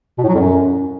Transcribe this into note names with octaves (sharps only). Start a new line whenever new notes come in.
B2
A2
F#3
F2
F#2